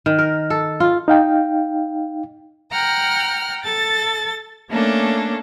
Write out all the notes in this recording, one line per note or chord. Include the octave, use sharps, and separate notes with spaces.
D#3
A#4
A4
F4
D#4 F5 G5
F#5 G5 A#5 F6
A4 A6
A3 A#3 C#4 D4 A4